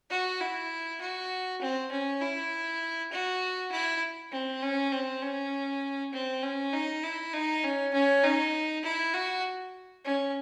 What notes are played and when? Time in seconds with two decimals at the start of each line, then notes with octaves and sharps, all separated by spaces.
0.11 F#4
0.41 E4
1.01 F#4
1.61 C4
1.91 C#4
2.21 E4
3.12 F#4
3.72 E4
4.32 C4
4.63 C#4
4.93 C4
5.22 C#4
6.13 C4
6.43 C#4
6.73 D#4
7.04 E4
7.34 D#4
7.64 C#4
7.94 C#4
8.24 D#4
8.84 E4
9.14 F#4
10.05 C#4